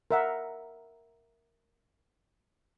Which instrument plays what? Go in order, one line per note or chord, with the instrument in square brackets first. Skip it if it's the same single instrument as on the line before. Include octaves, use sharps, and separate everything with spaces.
[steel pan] A#4 E5 F#5